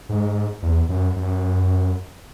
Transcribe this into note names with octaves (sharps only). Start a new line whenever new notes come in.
G#2
E2
F#2
F#2